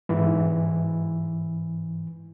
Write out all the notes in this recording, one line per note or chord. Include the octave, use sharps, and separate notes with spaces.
G#2 E3